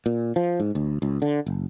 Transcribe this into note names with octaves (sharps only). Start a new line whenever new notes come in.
A#2
F3
G#2
D2
C#2
D3
F#1